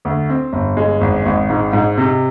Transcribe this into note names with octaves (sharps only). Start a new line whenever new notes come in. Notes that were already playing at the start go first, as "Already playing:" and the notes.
D2
C4
G1
G#3
G#1
G#1
G#2
G#2
C3